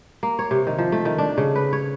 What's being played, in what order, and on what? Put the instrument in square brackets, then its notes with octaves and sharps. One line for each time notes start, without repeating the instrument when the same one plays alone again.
[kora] A#3
C#5
C3
D#3
F3
A3
D#3
D4
C#3
B4
C#5